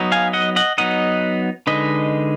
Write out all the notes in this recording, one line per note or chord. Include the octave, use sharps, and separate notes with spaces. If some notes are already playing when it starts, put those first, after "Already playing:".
Already playing: F#3 B3 D#4
F5 G#5
D#5 F#5
D#5 F#5
F#3 B3 D#4 D#5 F#5
D3 G#3 D#4 B4 D#5